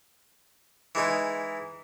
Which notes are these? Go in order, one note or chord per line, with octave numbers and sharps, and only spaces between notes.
E3 G#3 D#4